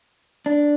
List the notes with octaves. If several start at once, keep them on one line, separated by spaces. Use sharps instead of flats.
D4